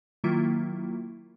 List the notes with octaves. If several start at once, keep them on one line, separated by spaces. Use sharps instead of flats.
D#3 F#3 A#3 E4 F4